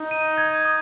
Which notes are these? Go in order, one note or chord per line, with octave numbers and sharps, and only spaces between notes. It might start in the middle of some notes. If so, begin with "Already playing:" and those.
Already playing: D#4
D#7
G#6
D#6